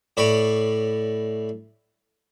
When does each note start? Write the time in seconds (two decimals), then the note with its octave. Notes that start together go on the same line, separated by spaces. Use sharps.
0.17 A2 C#5 D5 B5